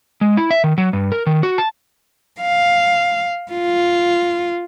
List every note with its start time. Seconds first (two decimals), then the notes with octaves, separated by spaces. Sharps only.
0.21 G#3
0.37 E4
0.51 E5
0.64 D#3
0.78 F#3
0.93 G2
1.12 A#4
1.27 D#3
1.43 F#4
1.58 A5
2.41 F5
3.52 F4